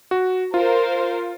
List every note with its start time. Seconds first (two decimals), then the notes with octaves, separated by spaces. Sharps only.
0.11 F#4
0.54 F4 A#4 C5 F5